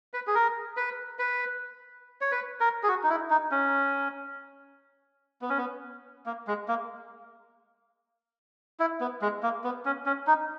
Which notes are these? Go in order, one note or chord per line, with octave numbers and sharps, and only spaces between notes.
B4
G#4
A#4
B4
B4
C#5
B4
A#4
G#4
F#4
D#4
E4
D#4
C#4
B3
C#4
B3
A#3
G#3
A#3
E4
B3
G#3
A#3
B3
C#4
C#4
D#4